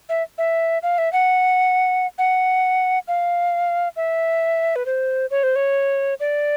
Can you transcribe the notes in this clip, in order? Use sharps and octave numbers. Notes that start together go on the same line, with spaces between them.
E5
E5
F5
E5
F#5
F#5
F5
E5
B4
C5
C#5
C5
C#5
D5